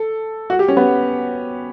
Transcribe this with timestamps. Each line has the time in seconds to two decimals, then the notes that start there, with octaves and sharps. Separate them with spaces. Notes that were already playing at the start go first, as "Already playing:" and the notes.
Already playing: A4
0.50 F#4
0.59 G4
0.68 C#4
0.77 B3